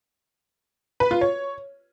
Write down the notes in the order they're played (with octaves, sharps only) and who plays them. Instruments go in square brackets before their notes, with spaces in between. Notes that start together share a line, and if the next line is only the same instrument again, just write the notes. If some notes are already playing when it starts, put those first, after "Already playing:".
[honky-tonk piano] B4
F4
C#5